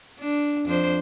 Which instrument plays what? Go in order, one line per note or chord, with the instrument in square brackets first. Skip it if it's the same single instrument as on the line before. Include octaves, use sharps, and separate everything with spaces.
[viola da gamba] D4
F2 D4 C5